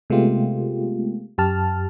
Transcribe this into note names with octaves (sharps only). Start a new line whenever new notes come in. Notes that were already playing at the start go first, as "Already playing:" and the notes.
C3 G#3 A3 B3 F4 G4
F#2 G4 A5 F6